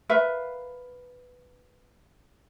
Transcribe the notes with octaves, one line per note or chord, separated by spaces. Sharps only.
A#4 B4 E5 F5